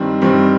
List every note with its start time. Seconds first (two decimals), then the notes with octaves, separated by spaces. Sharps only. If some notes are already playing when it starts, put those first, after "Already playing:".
Already playing: G2 D#3 G3 C4
0.22 G2 D#3 G3 C4